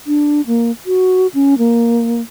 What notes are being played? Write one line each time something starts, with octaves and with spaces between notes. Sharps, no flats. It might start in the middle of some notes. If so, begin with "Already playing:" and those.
D4
A#3
F#4
C#4
A#3